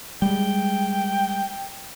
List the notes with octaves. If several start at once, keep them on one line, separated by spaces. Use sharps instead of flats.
G3 G#3 G5